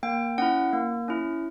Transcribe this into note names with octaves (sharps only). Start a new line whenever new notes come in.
A#3 G5
C#4 E4 F#5
A#3
C#4 E4